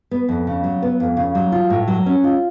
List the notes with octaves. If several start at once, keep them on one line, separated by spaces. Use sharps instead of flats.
B3
F2
C#3
F#3
B3
F2
C#3
F#3
F4
A2
F#3
C#4
F4